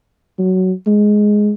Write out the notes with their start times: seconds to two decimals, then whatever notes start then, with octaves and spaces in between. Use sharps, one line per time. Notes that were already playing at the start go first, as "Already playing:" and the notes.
0.39 F#3
0.87 G#3